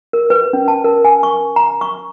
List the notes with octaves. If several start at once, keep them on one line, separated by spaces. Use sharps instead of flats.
A#4
B4
C#4
A5
A#4
G#5
C#6
A#5
C#6